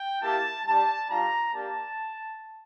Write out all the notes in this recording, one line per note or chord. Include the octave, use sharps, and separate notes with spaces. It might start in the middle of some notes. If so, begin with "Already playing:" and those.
Already playing: G5
A#3 E4 G4 A5
G3 D4 G4 A5
G3 D4 F4 A#5
A#3 D4 G4 A5